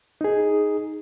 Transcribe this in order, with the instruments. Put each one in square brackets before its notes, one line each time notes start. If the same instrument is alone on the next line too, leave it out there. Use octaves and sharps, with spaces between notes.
[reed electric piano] D#4 G#4